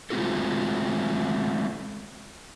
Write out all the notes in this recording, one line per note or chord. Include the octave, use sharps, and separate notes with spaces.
G#3 A3 C4 F4 F#4 A4